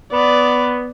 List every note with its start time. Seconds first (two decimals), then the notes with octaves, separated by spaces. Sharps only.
0.12 B3 D5